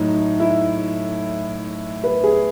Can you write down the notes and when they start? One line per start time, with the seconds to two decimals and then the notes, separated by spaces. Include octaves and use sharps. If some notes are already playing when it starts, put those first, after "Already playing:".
Already playing: A2 F#3 D#4
0.40 E4
2.04 B4
2.23 G#4